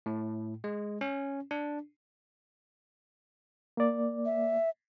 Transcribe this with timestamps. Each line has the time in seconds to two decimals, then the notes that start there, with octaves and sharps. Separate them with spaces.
0.06 A2
0.64 G#3
1.01 C#4
1.51 D4
3.77 A#3 D5
4.26 E5